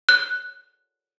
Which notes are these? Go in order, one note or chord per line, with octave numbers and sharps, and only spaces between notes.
F#6